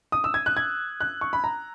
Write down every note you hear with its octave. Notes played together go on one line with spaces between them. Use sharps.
D#6
E6
G#6
F#6
G#6
F#6
C#6
B5
A#5